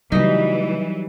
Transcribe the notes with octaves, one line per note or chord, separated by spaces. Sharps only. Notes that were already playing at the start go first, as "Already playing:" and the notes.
C#3 E3 F#3 G3 A3 D#4